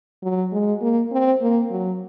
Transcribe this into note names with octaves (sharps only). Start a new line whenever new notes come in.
F#3
G#3
A#3
C4
A#3
F#3